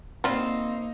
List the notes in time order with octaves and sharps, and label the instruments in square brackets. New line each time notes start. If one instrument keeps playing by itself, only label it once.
[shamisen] G3 F4 [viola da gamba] A#3 D#4 [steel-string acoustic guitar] C4 F5